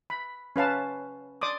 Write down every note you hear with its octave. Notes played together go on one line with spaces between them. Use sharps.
B5
C#4 B4 F5 A5
D5 C6 D6 D#6